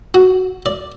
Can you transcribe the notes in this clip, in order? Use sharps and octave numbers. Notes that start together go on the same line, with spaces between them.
F#4
D5